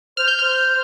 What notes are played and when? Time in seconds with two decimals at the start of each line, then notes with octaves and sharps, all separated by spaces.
0.17 C5 F6
0.28 G6
0.39 F6
0.45 C5